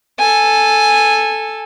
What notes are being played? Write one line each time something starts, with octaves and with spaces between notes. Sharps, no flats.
A4 G#5